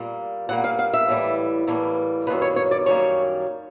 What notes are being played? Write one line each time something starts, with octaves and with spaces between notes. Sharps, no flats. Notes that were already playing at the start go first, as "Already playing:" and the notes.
Already playing: A#2 G3 A#3
A#2 G3 A#3 F#5
F5
F5
E5
A2 E3 G3 A#3
A2 E3 G3 A#3
F#2 D#3 G3 A#3 B4
C#5
C#5
D5
F#2 D#3 G3 A#3 C#5